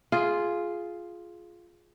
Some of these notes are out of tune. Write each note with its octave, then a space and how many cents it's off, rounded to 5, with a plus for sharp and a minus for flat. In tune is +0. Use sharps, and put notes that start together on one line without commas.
F4 +0 G#4 +10